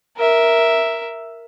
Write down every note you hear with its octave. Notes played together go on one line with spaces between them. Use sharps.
A#4 E5